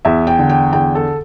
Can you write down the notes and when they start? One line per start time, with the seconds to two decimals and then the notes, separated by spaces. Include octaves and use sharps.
0.05 E2 E5
0.27 G5
0.39 D3
0.49 G5
0.73 E2 G5
0.95 A4